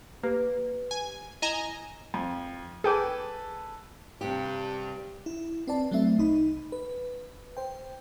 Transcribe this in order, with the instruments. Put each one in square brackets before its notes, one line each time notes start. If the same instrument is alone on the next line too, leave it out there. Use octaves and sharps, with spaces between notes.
[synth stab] A#3 [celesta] G4 B4
[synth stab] G#5
[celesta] E4 A#6 E7 [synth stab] D#5 G#5 A#5
[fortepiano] F2
[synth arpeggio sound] G#4 G5 D6 [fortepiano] A4 B4 G#5
[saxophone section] G2 [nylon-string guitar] C3 G4
[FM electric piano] E4
C4 B4 D5 A5
F#3 A3 C4 E5
C2 D#4 B5
B4
C5 G5